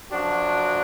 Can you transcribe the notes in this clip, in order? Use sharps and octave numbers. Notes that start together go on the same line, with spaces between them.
F#2 F3 D4 F#4